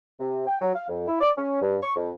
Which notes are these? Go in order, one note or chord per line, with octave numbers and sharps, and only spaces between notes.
C3
G5
F#3
F5
F2
E4
D5
C#4
G2
C#6
F2